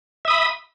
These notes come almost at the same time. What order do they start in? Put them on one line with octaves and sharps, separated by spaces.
E5 D#6 B5